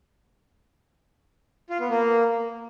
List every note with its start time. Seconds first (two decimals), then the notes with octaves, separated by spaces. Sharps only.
1.70 F4
1.80 B3
1.89 A#3